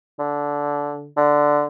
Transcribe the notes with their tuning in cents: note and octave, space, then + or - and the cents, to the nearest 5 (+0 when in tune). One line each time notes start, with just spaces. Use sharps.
D3 -15
D3 +0